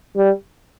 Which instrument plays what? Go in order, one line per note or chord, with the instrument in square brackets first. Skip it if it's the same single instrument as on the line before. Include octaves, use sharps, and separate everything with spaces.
[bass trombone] G3